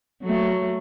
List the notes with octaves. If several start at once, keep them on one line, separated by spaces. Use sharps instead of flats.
F#3 A3